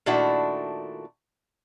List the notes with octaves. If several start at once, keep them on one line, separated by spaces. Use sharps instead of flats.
A#2 D#3 A3 D4 E4 F#4